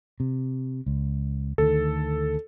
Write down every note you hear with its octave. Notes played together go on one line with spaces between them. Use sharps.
C3
C#2
D2 D#3 A4